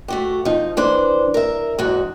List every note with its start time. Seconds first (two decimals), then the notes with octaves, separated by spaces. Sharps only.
0.08 A3 F#4 G4
0.45 F3 D#4
0.77 E3 D4 C5
1.34 A#4 E5
1.79 E2 G#2 F#4